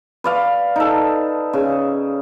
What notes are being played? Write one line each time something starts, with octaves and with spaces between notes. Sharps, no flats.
B4 D5 F5
D#4 A4
C#3